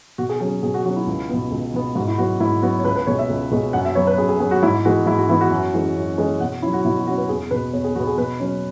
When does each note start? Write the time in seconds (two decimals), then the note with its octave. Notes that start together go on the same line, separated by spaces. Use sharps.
0.18 B2 F#4
0.29 G#4
0.40 F#3 C#4 G#4
0.63 B2 G#4
0.74 F#4
0.85 F#3 F#4
0.88 C#4
0.96 E4
1.07 C#2
1.29 B2 B3
1.51 C#2
1.74 B2 B3
1.95 G#2 F#4
2.07 E4
2.18 F#3 B3 F#4
2.40 G#2 E4
2.62 F#3 B3 F#4
2.79 C#5
2.85 C#2 B4
2.96 B4
3.07 B2 G#3 C#5
3.19 E5
3.30 C#2
3.51 B2 G#3
3.73 F#2 F#5
3.85 E5
3.95 F#3 B3 C#5
4.07 B4
4.18 F#2 G#4
4.29 G#4
4.40 F#3 B3 G#4
4.51 F#4
4.62 G#2 E4
4.85 E3 G#3 B3 F#4
5.06 G#2 E4
5.18 F#4
5.29 E3 G#3 B3 E4
5.41 F#4
5.51 F#2
5.73 E3 G#3 C#4
5.96 F#2
6.18 E3 G#3 C#4
6.40 B2 F#5
6.62 C#4 E4
6.66 F#3
6.73 F#4
6.84 B2 E4
6.96 F#4
7.06 F#3 F#4
7.10 C#4
7.18 B4
7.29 E2 G#4
7.51 B2 B3 B4
7.73 E2 C#5
7.84 G#4
7.95 B2 B3 F#4
8.07 G#4
8.17 B2 B4
8.40 F#3 C#4